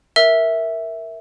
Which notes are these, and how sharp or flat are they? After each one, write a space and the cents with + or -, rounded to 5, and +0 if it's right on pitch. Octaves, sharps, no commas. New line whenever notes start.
A#4 +0 E5 -10 E6 +10